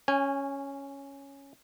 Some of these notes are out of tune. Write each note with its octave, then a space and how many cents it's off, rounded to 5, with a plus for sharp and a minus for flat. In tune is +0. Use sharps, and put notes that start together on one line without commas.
C#4 +0 G#5 -25